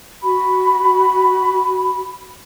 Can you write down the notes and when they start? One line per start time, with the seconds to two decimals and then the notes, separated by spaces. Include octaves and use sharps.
0.23 F#4 B5